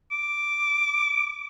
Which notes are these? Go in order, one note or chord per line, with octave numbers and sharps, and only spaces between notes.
D6